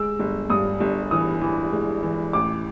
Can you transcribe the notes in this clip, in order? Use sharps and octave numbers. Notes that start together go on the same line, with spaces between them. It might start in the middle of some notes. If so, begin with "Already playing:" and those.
Already playing: G#3 E6
G1
G2 D#6
G1
E3 D#6
E3
G#3
E3
A1 D6